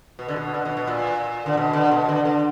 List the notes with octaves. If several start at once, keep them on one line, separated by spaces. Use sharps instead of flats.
B2
D3
B2
D3
B2
B2
A#2
D3
B2
D3
B2
D3
D3